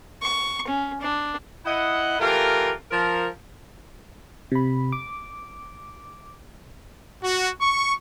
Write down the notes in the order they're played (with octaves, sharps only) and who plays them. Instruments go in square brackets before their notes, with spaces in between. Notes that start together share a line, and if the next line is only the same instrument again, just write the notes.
[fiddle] C#6
C#4
D4
[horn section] E4 D#5 F#5
E3 A3 F4 G4 A#4
F3 A#4
[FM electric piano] C3 B5
D6
[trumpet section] F#4
C#6